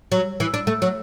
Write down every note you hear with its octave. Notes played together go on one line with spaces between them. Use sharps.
F#3
E3
D4
A3
F#3